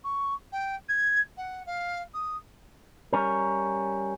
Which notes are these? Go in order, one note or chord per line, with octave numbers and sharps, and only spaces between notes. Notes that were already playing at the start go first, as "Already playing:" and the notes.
C#6
G5
G#6
F#5
F5
D#6
G3 C#4 A#4